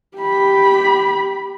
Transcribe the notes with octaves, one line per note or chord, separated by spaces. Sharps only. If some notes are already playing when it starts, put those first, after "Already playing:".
G4 B5